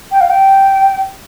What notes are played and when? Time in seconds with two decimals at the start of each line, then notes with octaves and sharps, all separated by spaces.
0.11 G5
0.20 F5
0.30 G5